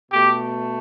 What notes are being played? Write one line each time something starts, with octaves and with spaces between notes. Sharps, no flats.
B2 A3 G4